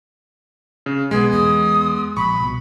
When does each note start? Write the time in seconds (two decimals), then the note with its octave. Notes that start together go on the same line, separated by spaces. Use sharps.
0.86 C#3
1.11 B1 G#3 B3 G#4
1.32 E2 D#6
2.17 A#1 B5 C#6
2.40 C2 B2